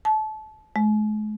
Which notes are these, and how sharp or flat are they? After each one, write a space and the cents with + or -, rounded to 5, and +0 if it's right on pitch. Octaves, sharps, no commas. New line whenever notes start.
A5 -25
G#3 +45